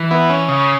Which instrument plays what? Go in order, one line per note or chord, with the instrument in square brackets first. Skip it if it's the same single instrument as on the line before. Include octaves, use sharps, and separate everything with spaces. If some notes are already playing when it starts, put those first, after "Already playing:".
Already playing: [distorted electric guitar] E3
[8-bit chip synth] B3 E4
C#4
[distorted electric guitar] C#3 [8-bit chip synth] C#4